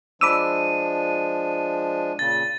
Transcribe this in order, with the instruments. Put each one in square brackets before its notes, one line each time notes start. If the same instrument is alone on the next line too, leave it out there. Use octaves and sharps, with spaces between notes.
[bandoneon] F3 G#3 D4 [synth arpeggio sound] B5 D6 E6 [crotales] D#7
[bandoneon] A#2 C#3 [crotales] A6